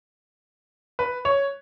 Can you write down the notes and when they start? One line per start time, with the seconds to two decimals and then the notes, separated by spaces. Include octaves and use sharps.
0.99 B4
1.25 C#5